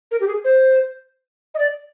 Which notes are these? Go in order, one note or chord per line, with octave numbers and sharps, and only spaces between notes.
A#4
G4
G#4
C5
D#5
D5